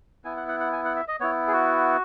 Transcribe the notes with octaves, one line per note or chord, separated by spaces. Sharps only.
B3 E4 G#5
F#5
F#5
F#5
G#5
F#5
E5
D#5
B3 E4 C#5
G#4
F#4